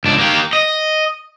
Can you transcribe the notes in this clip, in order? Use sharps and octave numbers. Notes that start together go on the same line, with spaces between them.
C#2 D4
A#3 G4
D#5